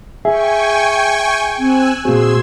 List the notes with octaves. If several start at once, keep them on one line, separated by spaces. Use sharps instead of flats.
G#4 E5 G5 G#5 C#6
C4 G#5 E6 F#6
A#2 C4 F#4 G#4 C6 E6 G#6